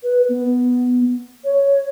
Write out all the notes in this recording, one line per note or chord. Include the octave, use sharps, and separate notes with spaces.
B4
B3
C#5